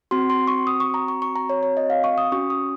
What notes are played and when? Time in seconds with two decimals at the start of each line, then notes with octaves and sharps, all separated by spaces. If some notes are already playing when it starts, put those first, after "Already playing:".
0.11 C4 F#4 C6
0.30 C6
0.48 C#6
0.67 D#6
0.80 C#6
0.94 A#5
1.08 C#6
1.22 C#6
1.36 A#5
1.50 C#5
1.63 C#5
1.77 D#5
1.90 F5
2.04 C#6
2.18 D#6
2.32 C#4 F#4 C#6
2.50 D#6